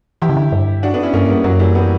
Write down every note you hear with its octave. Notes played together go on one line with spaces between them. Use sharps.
E3 E4 G4
C#3
D3
G2
D4 F#4
B3 D4
C#4 E4
G2 A#3 C#4
G3 B3
F#2 F#3 A#3
E3 G3
G3 B3